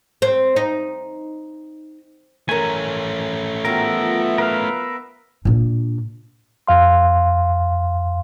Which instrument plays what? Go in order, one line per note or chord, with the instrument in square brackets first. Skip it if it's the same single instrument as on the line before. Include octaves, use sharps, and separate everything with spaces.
[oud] C4
D#4
[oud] F#2 A#4 [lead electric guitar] A3 C#4 [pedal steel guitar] G#5
[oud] F#3 F4 G4 [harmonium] B3 E5 [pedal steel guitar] A#4
[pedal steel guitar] A#4 B4 F5
[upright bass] A#2 D4
[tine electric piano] F2 F5 C6